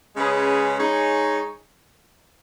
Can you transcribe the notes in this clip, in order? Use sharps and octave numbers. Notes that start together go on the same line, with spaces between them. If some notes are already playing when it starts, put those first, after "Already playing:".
C#3 G#3 C#4 G#4 B4
G#3 D#4 G#4 C#5